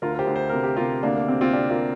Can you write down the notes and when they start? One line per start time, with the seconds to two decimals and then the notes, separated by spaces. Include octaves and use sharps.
0.02 D2 F4 A#4
0.15 A#4
0.19 G4 C5
0.27 D2
0.36 C5
0.49 C3 A#4
0.63 G4
0.76 C3 F4 A#4
1.03 D2 A#3 D4
1.15 A#3
1.28 C3 C4
1.41 C4 F4
1.53 C3 D4 G4
1.70 F4 A#4